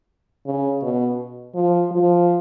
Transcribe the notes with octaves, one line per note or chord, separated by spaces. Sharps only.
C#3
B2
F3
F3